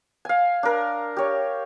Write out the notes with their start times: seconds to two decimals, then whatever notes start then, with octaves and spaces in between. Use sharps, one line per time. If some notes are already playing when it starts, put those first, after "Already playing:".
0.25 F5 G#5
0.63 D4 A#4
1.17 G4 C#5